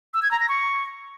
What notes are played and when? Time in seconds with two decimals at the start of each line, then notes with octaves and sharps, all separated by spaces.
0.14 E6
0.23 G#6
0.31 A#5
0.40 A#6
0.49 C#6